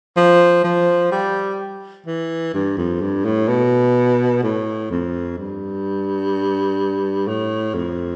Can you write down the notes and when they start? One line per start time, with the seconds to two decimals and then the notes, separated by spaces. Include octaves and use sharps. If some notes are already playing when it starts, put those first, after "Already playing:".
0.17 F3
0.64 F3
1.12 G3
2.06 E3
2.54 G2
2.78 F2
3.01 G2
3.25 A2
3.48 B2
4.43 A2
4.91 F2
5.38 G2
7.28 A2
7.75 F2